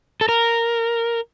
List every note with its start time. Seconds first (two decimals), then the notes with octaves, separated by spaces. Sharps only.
0.21 A4
0.29 A#4